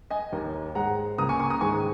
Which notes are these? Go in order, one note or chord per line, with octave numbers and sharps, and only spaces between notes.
D#5 G#5
D#2 D#3 A#3
G#2 G#3 F#5 A#5
C#2 C#3 A#3 A#5 D#6
G#5 C#6
G#5 C#6
A#5 D#6
G#2 D#3 G#3 G#5 C#6